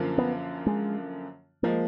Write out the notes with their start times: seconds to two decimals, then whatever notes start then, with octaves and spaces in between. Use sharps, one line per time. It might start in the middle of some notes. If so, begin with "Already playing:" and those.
Already playing: F#2 D3 F3 A#3 F4
0.18 B3
0.66 G#3
1.63 F3 G#3 A#3